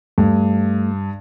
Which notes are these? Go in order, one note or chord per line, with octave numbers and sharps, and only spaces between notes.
G2 A3